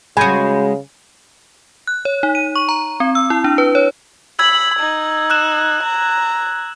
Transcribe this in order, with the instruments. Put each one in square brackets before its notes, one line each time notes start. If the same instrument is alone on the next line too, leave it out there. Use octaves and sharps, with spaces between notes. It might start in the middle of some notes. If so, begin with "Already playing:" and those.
[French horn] C#3 [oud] G#3 F#4 [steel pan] G#5 [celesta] B5 G6
[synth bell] F#6
C#5
D#4
D#7
C#6
A#5
C4
E6
E4
D4
B4
C#5
[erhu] B5 [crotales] E6 G#6 F#7
[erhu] D#4
[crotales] E6 F#6 E7
[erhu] A#5